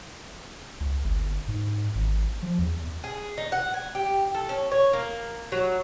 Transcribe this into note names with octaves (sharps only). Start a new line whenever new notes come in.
C#2
G1
G#2
G#1
F3
E2
G#4
D#4
F#5
G#5
G4
A4
C#4
C#5
A#3
F#3